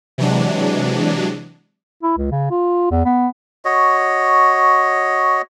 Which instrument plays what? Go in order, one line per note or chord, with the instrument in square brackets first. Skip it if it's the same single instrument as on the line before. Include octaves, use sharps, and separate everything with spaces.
[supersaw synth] C3 E3 F#3 G#3 D4
[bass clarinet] E4
C#2
C#3
F4
E2
B3
[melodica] F#4 C#5 D#5